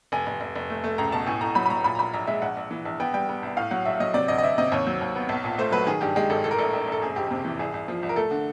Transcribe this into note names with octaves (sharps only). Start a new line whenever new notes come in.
F1 G#5
F1
F1
F1
A3
A3
C#2 A#5
B2 A5
A2 G#5
A2 A#5
F#3 B5
B5
F#3 A#5
A#2 B5
A#5
A#1 B5
A#1 A#5
G#3 E5
A#1 F#5
A#1
E3
A#1
B3 G5
G3 G5
B3
C2
A2 F5
F#3 F#5
A#1 E5
F#3 D#5
C3 D5
D2 D#5
D#5
D2 E5
C3 D#5
D#2 C#5
F#3
D#2
B3
B1
A#2
A3 C5
F#3 B4
D#3 G#4
G2 G4
G#3 G4
G#1 A4
A2 A4
A#4
A#1 A4
A#1
A#1 A4
F#1 G#4
F2 G4
C3
E3
C2 G#4
C2
F3
C2
A#4
A3 A4
D3